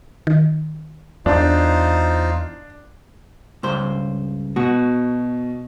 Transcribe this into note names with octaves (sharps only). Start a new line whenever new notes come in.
D#3
E2 D4 D#4 F4 C5
C#2 G2 C5
B2 F#4